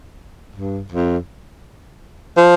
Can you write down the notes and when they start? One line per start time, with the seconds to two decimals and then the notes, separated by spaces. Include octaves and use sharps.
0.56 G2
0.92 F2
2.37 F3